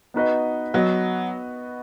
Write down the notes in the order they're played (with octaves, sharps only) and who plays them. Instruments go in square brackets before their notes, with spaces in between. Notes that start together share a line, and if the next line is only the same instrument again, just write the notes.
[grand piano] B3 D#4 F#4 B4 D#5
[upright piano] F#3 [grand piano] B3 F#4 B4 D#5